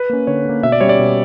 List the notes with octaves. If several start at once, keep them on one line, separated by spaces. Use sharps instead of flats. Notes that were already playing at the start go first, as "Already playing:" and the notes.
Already playing: B4
A#3 C#4
D3 C#5
A#3 C#4
B2 E5
D5
G3 C#4 C#5
D5
B2